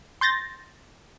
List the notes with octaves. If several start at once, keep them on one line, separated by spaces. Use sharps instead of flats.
C6 G6 A6 A#6